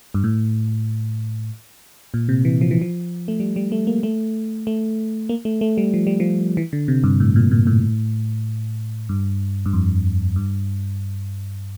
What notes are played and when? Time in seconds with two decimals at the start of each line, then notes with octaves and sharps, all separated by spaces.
0.14 G2
0.24 A2
2.14 A#2
2.29 C3
2.45 E3
2.61 F3
2.71 E3
2.81 F3
3.28 A3
3.40 G3
3.56 G3
3.72 A3
3.87 A#3
4.03 A3
4.67 A3
5.29 A#3
5.45 A3
5.61 A3
5.78 G3
5.94 F3
6.07 G3
6.20 F3
6.57 E3
6.73 D3
6.88 C3
7.04 G2
7.20 A2
7.36 A#2
7.51 A#2
7.67 A2
9.09 G2
9.66 G2
9.73 F2
10.36 G2